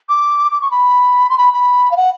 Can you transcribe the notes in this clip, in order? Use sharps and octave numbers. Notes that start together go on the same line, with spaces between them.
D6
D6
C#6
B5
C6
B5
B5
F5
F#5